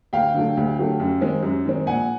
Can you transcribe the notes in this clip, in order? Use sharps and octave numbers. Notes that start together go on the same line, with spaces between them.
D2 F5 G5
D3 F#3 A3
D2
D3 F#3 A3
F#2
D#3 G#3 C4
F#2
D#3 G#3 C4
A#1 F#5 G#5